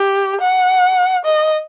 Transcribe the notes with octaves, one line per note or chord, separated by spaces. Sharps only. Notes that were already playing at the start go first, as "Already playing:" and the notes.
Already playing: G4
F#5
D#5